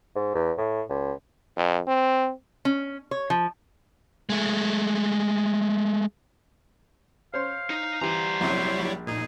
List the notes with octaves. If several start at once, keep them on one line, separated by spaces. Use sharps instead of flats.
G#2
E2
A2
C#2
F2
C4
C#4
C#5
F3
G#3 A3
C5 C#5 F5 C6
D#4
E3 G3 G4 C5 A#5
A#1 C3 F#3 E4 C#5
A#1
A#2 D#4 G#4